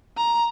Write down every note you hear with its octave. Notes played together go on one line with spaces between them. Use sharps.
A#5